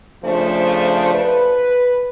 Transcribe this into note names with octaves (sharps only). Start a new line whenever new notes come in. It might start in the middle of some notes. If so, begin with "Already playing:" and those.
C#3 F3 A3 D4 F4 C5
B4